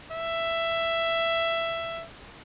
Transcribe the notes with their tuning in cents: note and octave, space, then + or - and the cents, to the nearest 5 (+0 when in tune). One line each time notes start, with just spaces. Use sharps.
E5 +10